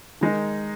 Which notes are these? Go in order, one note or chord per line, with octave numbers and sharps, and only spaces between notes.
D#3 G#3 D#4